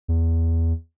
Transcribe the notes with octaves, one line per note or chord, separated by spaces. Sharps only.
E2